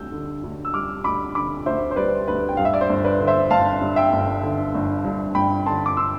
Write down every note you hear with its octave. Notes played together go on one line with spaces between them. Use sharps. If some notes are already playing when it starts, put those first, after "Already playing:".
Already playing: D2 G3 E6 G6
D3
D2
E6
G3 D6 F6
D2 B5 D6
D3 B5 D6
D2 C5 E5
C5
G3 B4 D5
D2 B4
G5
G2 F5
E5
D5
C5
G1
B4 D5
D3
C5 E5
G1 F5 A5
G2
E5 G5
G1
D3
G1
G2
G1 G5 B5
D3 A5 C6
D6
C6 E6